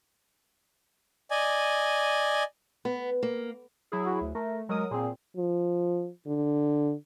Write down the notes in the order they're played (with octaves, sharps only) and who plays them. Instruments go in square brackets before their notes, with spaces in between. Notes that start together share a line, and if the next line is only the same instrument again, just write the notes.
[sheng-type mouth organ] D5 D#5 G#5
[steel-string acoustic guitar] B3
A#3
[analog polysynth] F#3 E4 G#4
[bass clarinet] F#4
D2
[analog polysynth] A3 [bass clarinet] A#4
[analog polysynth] F#3 A#4 D#6 [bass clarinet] G#3
[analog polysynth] A#2 C4 [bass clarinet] G#4
[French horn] F3
D3